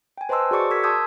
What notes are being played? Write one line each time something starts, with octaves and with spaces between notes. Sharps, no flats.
G5 G#5
B4 C5 D#5 A5 C6 E6
F#4 G#4 D5 C#6 D6 C#7
A#4 E6 G#6 B6
A5 C6 D#6 E6 G6 G#6